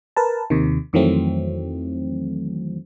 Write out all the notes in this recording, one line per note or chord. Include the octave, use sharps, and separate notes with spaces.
A#4 B4 A5
D#2 C3 D#3
F2 D#3 E3 F#3 A3 C4